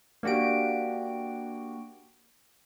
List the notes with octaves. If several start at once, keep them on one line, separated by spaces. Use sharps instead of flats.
A#3 D4 F#4 G4 D7